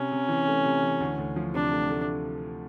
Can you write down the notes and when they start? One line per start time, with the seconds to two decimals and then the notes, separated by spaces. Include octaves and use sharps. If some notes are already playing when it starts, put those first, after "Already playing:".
Already playing: C3 C#4
0.12 C3
0.29 E3
0.47 A3
0.64 C3
0.83 E3
1.01 D2
1.18 D2
1.36 F3
1.54 C3 D4
1.72 A3
1.90 A3